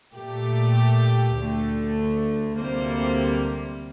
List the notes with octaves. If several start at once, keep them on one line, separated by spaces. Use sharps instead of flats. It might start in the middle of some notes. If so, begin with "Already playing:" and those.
A#2 A3 G4
D2 D3 A3
D2 C3 G3 A#3 C5